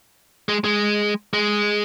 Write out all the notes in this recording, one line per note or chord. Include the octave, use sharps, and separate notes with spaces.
G#3
G#3
G#3